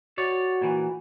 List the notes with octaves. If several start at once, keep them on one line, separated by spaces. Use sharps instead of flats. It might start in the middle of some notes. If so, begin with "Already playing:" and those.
F#4 C#5 D5
A#2 E3